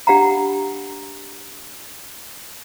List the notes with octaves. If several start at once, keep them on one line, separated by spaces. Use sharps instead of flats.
D4 G4 F5 F#5 A#5